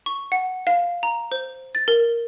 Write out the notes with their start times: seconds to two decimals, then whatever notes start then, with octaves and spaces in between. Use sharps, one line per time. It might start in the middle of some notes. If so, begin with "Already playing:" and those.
0.06 C#6
0.32 F#5
0.67 F5
1.03 A#5
1.32 C5
1.75 A6
1.88 A#4